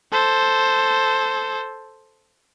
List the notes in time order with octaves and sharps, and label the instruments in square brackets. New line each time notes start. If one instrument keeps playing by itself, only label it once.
[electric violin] A4 C5